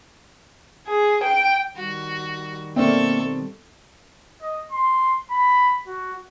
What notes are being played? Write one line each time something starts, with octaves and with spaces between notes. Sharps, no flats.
G#4
G5
D#3 G3 F#4
B2 A#3 C4 A4 D5 E5 C#6
D#5
C6
B5
F#4